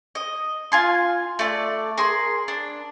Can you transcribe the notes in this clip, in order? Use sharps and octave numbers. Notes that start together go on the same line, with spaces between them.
D#5
F4 G#5 C6
A3 D5
G#4 A#4 C6
D4